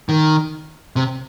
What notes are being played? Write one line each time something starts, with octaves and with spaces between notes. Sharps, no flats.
D#3
C3